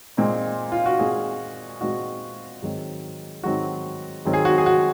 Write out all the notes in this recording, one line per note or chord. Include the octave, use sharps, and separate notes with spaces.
A#2 G#3 C4 D#4
F4
F#4
A#2 G#3 C4 D#4 G#4
A#2 G#3 C4 D#4 F#4
G#2 D#3 F#3 C4
G#2 D#3 F#3 C4 F#4
G#2 D#3 F#3 C4
G#4
F#4
G#4
F#4